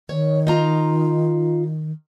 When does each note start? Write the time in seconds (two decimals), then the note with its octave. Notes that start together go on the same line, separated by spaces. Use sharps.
0.09 D#3 C#5
0.47 D#4 F4 A#5